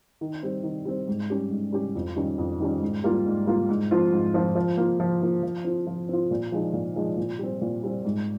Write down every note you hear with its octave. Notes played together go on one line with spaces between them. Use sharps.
D#3
G3 C4
D#3
G3 C4
G#2
G3 C#4 G4
G#2
G3 C#4 G4
F2
D#3 G3 C#4
F2
D#3 G3 C#4
G#2
G3 A#3 F4
G#2
G3 A#3 F4
G#2
F3 C4 F4
G#2
F3 C4 F4
F3
A#3 F4
F3
A#3 F4
F3
C4 F4
F3
C4 F4
A#2
F3 G#3 D#4
A#2
F3 G#3 D#4
A#2
G3 C4
A#2
G3 C4
G#2